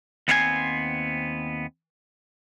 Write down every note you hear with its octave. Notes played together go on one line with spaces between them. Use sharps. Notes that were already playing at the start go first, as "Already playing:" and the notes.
D#2 B3 C4 C5 F5 G#5